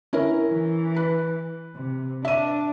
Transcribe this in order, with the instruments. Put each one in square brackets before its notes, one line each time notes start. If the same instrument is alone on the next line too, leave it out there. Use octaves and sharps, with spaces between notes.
[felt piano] C#4 E4 A#4
[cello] E3
[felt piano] B4
[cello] C3
[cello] D4 [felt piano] E5 D#7